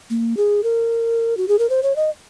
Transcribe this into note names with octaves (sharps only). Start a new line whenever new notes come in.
A#3
G#4
A#4
F#4
G#4
A#4
C5
C#5
D#5